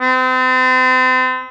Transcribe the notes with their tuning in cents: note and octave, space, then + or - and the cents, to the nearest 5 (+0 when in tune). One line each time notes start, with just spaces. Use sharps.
C4 -35